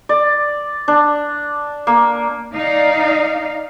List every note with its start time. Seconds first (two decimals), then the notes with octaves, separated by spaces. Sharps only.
0.09 D5
0.88 D4
1.87 A#3
2.54 D#4 D5 F5